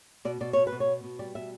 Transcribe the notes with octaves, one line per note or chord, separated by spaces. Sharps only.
B2 D5
B2 D5
B2 C#5
B4
B2
C#5
B3
B2
G3 D5
B2 E5